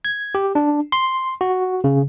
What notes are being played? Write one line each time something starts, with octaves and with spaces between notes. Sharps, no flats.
G#6
G4
D4
C6
F#4
C#3